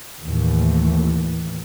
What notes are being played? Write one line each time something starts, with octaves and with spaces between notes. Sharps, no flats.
D#2 A2 E3